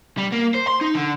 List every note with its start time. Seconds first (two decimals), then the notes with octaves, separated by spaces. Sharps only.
0.18 G3
0.32 A#3
0.54 C5
0.67 C6
0.81 D#4
0.95 D3